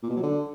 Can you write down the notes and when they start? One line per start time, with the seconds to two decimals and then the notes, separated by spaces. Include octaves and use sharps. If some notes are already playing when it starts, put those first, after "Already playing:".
0.03 A#2
0.10 B2
0.16 F#3
0.23 D3